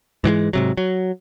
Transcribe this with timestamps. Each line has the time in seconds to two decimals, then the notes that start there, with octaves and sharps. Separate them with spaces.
0.24 G#2 E3 F3 G#3
0.53 G#2 C3 F#3
0.77 F#3